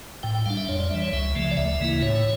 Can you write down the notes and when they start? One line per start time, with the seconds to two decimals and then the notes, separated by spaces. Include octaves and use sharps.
0.23 A2 G5
0.35 G5
0.46 G3 D4 F5
0.57 E5
0.69 F2 C#5
0.80 D5
0.90 E3 G3 E5
1.02 C#5
1.13 C#2 E5
1.35 C#3 F3 A3
1.51 D5
1.57 D2 E5
1.80 C#3 E3 A#3 E4
2.02 A2 C#5